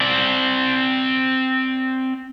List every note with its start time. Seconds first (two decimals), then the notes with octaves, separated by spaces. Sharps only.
0.01 C4 D5